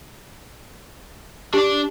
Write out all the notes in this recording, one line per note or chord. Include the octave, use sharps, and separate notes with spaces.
D4 G4 D5